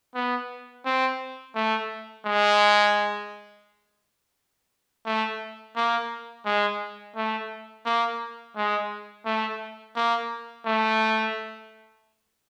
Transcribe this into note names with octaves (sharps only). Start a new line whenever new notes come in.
B3
C4
A3
G#3
A3
A#3
G#3
A3
A#3
G#3
A3
A#3
A3